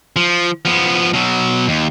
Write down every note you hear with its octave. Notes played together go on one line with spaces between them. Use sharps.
F3
F3 B3
B2 F#3
D#2